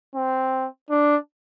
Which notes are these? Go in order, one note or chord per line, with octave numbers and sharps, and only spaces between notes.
C4
D4